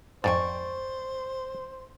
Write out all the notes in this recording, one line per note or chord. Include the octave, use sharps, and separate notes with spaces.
F2 G#2 C5 D5 C#6